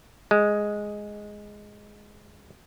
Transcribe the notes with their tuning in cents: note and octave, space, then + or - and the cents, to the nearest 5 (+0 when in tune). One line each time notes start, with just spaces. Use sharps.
G#3 +0